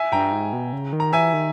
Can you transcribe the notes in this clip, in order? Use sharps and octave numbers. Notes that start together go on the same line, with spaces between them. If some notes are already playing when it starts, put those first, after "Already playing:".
Already playing: E5 G#5
G2 G5 A#5
G#2
B2
C#3
D#3
A#5
E3 E5 G#5
D#3